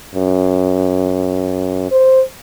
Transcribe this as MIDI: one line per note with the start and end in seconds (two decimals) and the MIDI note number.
0.15 1.87 42
1.91 2.21 72